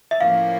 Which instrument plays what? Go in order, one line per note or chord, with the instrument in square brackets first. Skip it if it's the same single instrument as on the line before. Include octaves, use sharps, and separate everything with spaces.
[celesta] E5
[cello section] A2 F3 A#3 C#4 E4 [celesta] F5